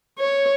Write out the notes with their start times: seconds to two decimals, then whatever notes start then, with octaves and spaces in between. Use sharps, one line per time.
0.18 C#5